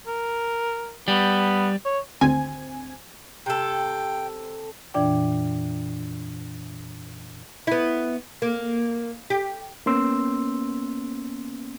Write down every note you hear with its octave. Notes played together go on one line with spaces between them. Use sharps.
A#4
G3 B3
C#5
G#1 D2 C4 G#5
C3 A4 G5
F2 A#2 E3 D4 D5 G5
B3 E4
A#3
G4
A#3 B3 C#4 C6 E6